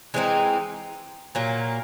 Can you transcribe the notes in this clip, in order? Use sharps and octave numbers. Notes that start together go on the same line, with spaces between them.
E3 G#3 C4 D#4
A#2 F#3 A#3